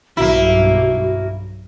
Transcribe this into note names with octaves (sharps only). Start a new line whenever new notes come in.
B1 G2 A#3 E4 F#4